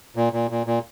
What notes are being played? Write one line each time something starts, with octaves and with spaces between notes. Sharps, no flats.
A#2
A#2
A#2
A#2